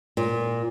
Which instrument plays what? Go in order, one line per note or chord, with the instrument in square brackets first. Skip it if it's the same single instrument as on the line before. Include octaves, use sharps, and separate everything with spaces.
[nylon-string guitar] A#2